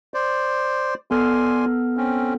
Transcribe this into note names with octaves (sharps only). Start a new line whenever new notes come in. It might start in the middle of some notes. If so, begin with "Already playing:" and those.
C5 D5
B3 A4 D5 G#5 C6 F6
C4 C#4